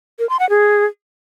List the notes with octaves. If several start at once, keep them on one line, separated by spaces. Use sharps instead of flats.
A#4
C6
F#5
G#4